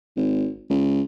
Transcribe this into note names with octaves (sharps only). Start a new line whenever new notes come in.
G#1
C#2